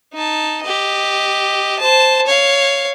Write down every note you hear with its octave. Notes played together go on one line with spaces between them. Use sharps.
D#4 A5
G4 D#5
C5 A5
C#5 F5